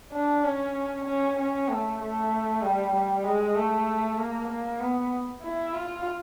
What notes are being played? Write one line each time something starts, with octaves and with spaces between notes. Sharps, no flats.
D4
C#4
C#4
C#4
A3
A3
G3
G3
G#3
A3
A#3
A#3
B3
E4
F4